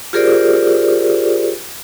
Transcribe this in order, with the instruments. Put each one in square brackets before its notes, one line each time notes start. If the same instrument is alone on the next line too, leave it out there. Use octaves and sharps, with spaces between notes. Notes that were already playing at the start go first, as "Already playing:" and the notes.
[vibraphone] F4 G4 G#4 A#4 C5 D5